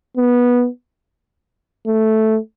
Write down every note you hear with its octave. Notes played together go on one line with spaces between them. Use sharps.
B3
A3